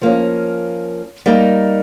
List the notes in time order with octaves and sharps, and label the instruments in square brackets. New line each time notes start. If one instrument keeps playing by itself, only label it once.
[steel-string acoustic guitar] F3 A#3 C#4
G3 A#3 D#4